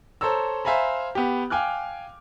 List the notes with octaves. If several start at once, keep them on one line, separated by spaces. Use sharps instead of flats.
A4 C5 C#5 A#5 E6
C5 E5 F5 G#5 A#5 B5
B3 G4
F5 G5 G#5 D6 F6 F#6